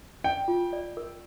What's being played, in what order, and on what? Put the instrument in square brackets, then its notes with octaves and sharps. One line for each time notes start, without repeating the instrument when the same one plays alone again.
[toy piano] D5 [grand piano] G5
[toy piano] F4
D5
A#4